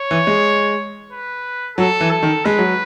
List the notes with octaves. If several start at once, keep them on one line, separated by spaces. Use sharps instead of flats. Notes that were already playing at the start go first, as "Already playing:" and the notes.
Already playing: C#5
E3
G#3
B4
F#3 A4
E3
A4
D#3
G#3 B4
F#3